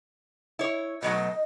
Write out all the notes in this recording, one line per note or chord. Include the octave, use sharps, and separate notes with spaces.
E4 C#5
B2 F#3 A3 D#5